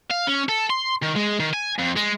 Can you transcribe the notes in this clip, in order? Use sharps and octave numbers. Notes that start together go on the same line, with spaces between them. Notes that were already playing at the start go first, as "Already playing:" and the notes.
F5
C#4
A4
C6
D#3
G#3
D#3
G#5
F2
G#3